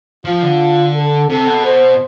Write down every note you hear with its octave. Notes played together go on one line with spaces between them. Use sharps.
F3 F4
D3
A4
C3 A4
B2
C5